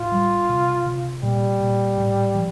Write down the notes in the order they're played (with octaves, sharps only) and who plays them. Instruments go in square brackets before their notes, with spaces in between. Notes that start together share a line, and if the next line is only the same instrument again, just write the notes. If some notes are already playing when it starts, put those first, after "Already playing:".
Already playing: [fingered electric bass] A2 [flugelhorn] F4
[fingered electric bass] G3
C3
C3
[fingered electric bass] A#2 [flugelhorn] G3
[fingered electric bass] A#2
A2
F3